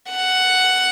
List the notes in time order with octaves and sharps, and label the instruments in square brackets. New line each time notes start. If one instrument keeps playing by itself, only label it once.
[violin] F#5